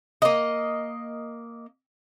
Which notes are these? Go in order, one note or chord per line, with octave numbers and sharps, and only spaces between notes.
A#3 D#5